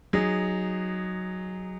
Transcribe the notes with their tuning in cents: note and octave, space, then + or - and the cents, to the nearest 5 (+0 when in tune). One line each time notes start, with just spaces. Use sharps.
F#3 +0 D#4 +0 G#4 -15